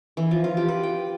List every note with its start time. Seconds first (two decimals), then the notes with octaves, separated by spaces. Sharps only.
0.17 E3
0.31 F3
0.44 F4
0.57 G4
0.68 B4
0.83 G5